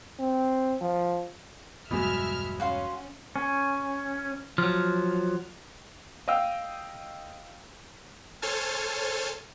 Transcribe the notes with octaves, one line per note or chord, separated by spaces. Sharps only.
C4
F3
E1 G2 B2 F#3 G#3 E5 F6
C#4 F#4 F5 C6
C#4
F3 F#3 F6
D#5 F5 G5 E6
A4 C5 C#5 G#5 A5 F6